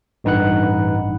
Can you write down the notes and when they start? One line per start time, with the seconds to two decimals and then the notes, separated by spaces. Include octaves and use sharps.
0.24 A1 G2 D#4 B4 F#5 F#6